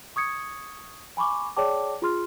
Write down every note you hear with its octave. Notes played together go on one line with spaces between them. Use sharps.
C#6 D#6 G#6 C#7
G#5 B5 C#6 D6
G#4 C#5 D5 G5 A5 D6
F4 G#4 C6 F6